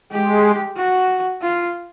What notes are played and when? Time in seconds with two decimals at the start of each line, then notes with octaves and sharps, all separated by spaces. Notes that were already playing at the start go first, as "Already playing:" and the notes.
0.12 G#3 G4
0.77 F#4
1.42 F4